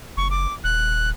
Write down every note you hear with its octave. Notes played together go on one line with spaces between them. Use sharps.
F#1 C#6
D6
D#1 F#6